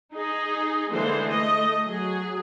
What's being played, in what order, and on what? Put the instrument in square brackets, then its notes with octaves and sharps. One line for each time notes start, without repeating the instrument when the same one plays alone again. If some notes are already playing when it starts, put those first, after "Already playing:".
[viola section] D#4 G#4
D3 E3 G#3 A#3 C5
A3 D#5
F#3 G#4